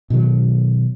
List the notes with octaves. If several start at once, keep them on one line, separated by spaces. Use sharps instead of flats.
B2 D#3 F#3